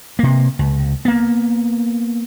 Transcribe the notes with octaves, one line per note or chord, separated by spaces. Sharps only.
C3 A#3
C#2
A#3 B3